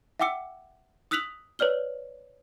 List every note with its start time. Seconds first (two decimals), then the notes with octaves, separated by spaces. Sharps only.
0.20 E5 F#5 G5 D6 E6 C#7
1.11 D#6 E6 F#6 B6 F7 F#7
1.59 B4 C#5 D5 F6 G7